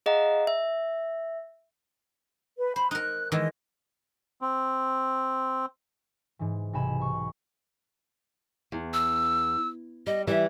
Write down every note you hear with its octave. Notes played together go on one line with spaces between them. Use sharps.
G#4 D#5 F5 F#5 A#5
E5
B4
C5 B5
D#4 A#4 F#6
D#3 E3 G#3 D#5
C4
G#2 E3
B1 C3 F#5 G#5 B5 E7
B5 C#6
E2
E6
G3 D#5
E3 G3 E5